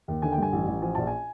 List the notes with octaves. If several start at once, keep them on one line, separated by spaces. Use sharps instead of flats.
D#2
D3 G#5
G5
G2 G#5
A1
A1
F3 G#5
A#1 A5
G#5